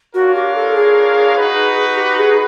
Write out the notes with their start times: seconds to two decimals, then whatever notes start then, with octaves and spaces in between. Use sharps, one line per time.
0.14 D4 F4 F#4 A#4 C#5 F5
0.35 G4
0.56 A4
0.75 G#4
1.36 D#4 F#4 B4
1.97 G4
2.18 G#4